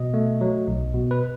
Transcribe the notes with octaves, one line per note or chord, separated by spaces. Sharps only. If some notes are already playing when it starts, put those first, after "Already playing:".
Already playing: B2 D#5
A3
F#3
B1
B2
B4